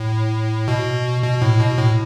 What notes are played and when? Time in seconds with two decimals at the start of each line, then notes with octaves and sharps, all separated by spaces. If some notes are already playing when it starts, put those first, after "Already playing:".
Already playing: A2
0.68 B2
1.22 B2
1.42 A2
1.60 B2
1.77 A2